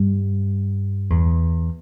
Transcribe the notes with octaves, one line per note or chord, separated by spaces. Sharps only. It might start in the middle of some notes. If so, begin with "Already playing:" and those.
Already playing: G2
E2